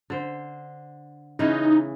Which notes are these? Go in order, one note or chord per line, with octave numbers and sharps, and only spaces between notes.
D3 C5
C#3 E3 A3 D#4